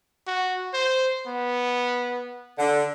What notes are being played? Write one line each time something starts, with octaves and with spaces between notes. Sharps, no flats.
F#4
C5
B3
D3